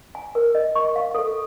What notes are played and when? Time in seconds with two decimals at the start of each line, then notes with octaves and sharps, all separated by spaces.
0.15 G#5
0.35 A#4
0.55 D#5
0.75 C#6
0.96 F5
1.15 A4